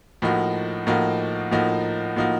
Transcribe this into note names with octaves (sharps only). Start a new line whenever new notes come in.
A2 F3 A#3 D#4 F#4
A2 F3 A#3 D#4 F#4
A2 F3 A#3 D#4 F#4
A2 F3 A#3 D#4 F#4